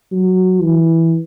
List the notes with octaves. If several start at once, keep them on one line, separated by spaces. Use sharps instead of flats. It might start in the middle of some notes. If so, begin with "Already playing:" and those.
F#3
E3